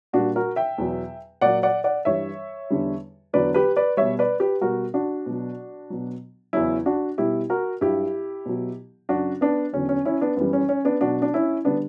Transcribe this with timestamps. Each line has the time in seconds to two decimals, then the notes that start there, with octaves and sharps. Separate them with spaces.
0.13 A#2 G3 D4 F#4
0.36 F#4 A#4
0.56 E5 G5
0.78 E2 B2 F#3
1.41 A#2 F#3 D5 F#5
1.63 D5 F#5
1.84 D5 F#5
2.05 G2 E3 G3 C#5 E5
2.70 E2 D3 G3
3.33 E2 D3 F#3 B4 D5
3.54 G4 B4
3.76 B4 D5
3.97 B2 G3 C#5 E5
4.19 B4 D5
4.40 G4 B4
4.61 B2 G3 F#4 A#4
4.94 D4 F#4
5.26 B2 F#3
5.90 B2 F#3
6.53 E2 C#3 F#3 C#4 E4
6.86 D4 F#4
7.18 B2 G3 E4 G4
7.50 F#4 A#4
7.81 G2 F#3 E4 G4
8.46 B2 F#3
9.09 F#2 C#3 F#3 D4 F#4
9.41 B3 D4
9.73 E2 D3 F#3 C#4
9.89 C#4
10.05 C#4 E4
10.21 B3 D4
10.37 F#2 E3 G3 B3
10.53 C#4
10.69 C#4
10.85 B3 D4
11.01 B2 F#3 D4 F#4
11.22 D4
11.34 C#4 E4
11.65 D3 G3 B3 D4